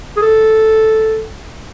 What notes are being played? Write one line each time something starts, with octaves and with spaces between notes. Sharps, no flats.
G#4
A4